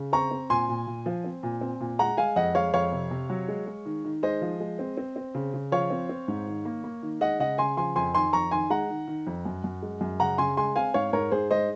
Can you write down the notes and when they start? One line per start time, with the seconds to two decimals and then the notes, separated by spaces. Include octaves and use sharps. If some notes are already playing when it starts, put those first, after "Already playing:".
Already playing: C#3
0.13 C4 A#5 C#6
0.31 C4
0.50 A#2 G#5 C6
0.69 A#2
0.87 A#2
1.06 F3
1.24 C4
1.43 A#2
1.61 C4
1.80 A#2
1.99 G#3 F#5 A#5
2.17 G#3 F5 G#5
2.36 F2 D#5 F#5
2.55 G#3 C#5 F5
2.74 F2 C#5 F5
2.92 C3
3.11 C3
3.30 F#3
3.48 G#3
3.67 G#3
3.86 D#3
4.05 D#3
4.23 G#3 C5 D#5
4.42 F3
4.60 G#3
4.79 C4
4.97 C4
5.16 C4
5.35 C#3
5.54 C#3
5.72 F3 C#5 F5
5.90 C4
6.09 C4
6.28 G#2
6.47 D#3
6.65 A#3
6.84 A#3
7.02 D#3
7.21 G#3 D#5 F#5
7.40 C#3 D#5 F#5
7.58 C#3 G#5 C6
7.77 F3 G#5 C6
7.96 F2 G#5 C6
8.15 D#3 G#5 C6
8.33 F2 A#5 C#6
8.51 D#3 G#5 C6
8.70 G#3 F#5 A#5
8.90 D#3
9.07 D#3
9.27 F2
9.45 F#2
9.64 F#2
9.83 G#3
10.01 F#2
10.20 C#3 F#5 A#5
10.38 C#3 G#5 C6
10.57 G#3 G#5 C6
10.76 C4 F5 G#5
10.94 G#2 C#5 F5
11.13 G#2 A#4 C#5
11.32 G#2 G#4 C5
11.51 G#3 C5 D#5